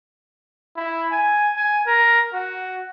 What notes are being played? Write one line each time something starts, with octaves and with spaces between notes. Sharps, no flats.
E4
G#5
G#5
A#4
F#4